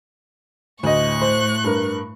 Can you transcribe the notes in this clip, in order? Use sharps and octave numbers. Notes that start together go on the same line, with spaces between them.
D2 A2 D#5 C#6 F#6
C5
G2 A#4